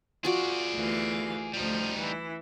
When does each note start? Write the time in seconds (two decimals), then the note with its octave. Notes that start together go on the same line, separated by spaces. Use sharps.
0.25 F4 F#4 G#4 D5
0.75 D2 E3 F5
1.54 D2 F3 G3 D#4
1.97 E3 E4